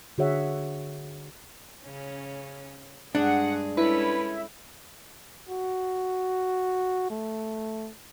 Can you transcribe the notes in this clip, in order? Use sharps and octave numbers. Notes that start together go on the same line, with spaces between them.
D3 F#4 G#4 C#5 E5 F#5
C#3 C#4
G2 G#3 D4 G#4 F#5
G#3 C#4 E4 A4 B4
F#4
A3